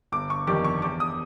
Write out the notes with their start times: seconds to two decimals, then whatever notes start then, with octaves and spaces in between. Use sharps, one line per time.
0.12 G1 D6
0.30 C#6
0.47 F2 C3 D#3 G3 D6
0.64 C#6
0.82 E2 D6
1.00 D#6